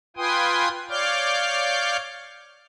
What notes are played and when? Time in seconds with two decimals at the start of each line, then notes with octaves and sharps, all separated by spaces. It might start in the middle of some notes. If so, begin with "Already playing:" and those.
0.17 F4 B4 G5 G#5 C6 D#6
0.89 C#5 D5 F5 D6 F6 G6